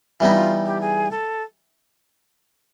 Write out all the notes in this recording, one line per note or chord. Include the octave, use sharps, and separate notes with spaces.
E3 G3 B3 D#4 E4
F4
G4
G#4
A4